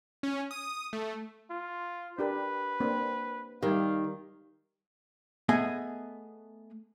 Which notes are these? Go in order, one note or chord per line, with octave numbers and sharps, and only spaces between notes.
C#4
D#6
A3
F4
D4 G4 A#4 B4
A#3 C4 D4
D#3 G3 G4 F5
A3 B3 G#4 D#5 G#5